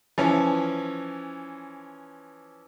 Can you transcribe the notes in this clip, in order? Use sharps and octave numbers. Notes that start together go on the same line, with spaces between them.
E3 F3 C#4